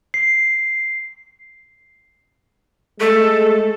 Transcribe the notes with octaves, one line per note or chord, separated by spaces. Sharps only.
C7
G#3 A3 A4